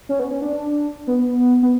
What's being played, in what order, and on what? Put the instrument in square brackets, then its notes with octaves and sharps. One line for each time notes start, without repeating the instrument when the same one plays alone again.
[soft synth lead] C#4
B3
C#4
D4
B3
B3